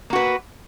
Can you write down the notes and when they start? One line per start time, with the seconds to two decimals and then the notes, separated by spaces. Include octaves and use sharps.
0.10 A#3
0.13 F#4
0.16 B4